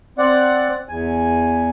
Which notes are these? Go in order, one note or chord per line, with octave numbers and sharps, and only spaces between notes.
C4 D5 F#5
E2 G#5